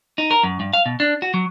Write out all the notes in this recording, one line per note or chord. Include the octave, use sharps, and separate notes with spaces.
D#4
A#4
F#2
G2
F5
B2
D4
F#4
F#3